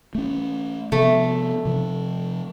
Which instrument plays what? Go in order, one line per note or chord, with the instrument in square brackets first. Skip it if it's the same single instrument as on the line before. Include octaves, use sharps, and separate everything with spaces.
[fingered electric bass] A3 C#4
[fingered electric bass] C3 F3 B3 [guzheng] A3
[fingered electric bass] C3 F3